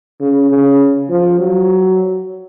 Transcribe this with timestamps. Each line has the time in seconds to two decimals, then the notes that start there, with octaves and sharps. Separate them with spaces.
0.20 C#3
0.50 C#3
1.10 F3
1.39 F#3